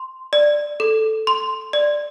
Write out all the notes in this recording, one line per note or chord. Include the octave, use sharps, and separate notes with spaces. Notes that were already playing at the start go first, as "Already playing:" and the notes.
Already playing: C6
D5
A4
C6
D5